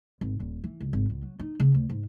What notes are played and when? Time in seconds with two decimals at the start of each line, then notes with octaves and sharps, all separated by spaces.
0.21 G#1
0.40 D#1
0.64 E3
0.80 C#2
0.93 G#1
1.10 C#2
1.23 F#3
1.39 D#4
1.60 C#3
1.74 D2
1.89 G#2